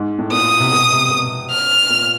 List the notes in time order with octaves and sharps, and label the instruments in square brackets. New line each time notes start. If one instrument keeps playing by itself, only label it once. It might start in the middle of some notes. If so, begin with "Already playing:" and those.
Already playing: [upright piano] G#2
A2
[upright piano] A#2 [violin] D#6
[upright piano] C3
B2
C3
B2
[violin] F6
[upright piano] A#2